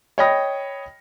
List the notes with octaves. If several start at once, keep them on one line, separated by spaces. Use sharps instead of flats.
C#5 D#5 G5 B5 D#6 A#6